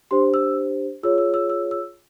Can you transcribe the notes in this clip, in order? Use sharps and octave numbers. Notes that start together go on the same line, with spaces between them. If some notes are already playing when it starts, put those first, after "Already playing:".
D4 G4 C5 C6
E6
F4 G#4 C#5 E6
E6
E6
E6
E6